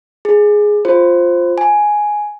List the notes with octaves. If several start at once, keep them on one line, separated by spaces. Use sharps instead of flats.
G#4
F4 C5
G#5